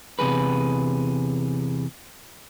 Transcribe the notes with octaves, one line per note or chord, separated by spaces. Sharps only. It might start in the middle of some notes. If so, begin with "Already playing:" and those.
E2 C3 F#3 G#4 B4